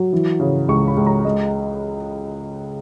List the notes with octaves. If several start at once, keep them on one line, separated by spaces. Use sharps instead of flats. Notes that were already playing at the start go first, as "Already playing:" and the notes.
Already playing: F#3
E3
C#3
C#2 C#6
B5
C#2
A#5
G#3 D#5